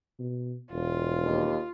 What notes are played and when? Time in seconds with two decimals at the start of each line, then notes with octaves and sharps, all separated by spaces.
0.19 B2
0.72 E1 F4
1.22 D#2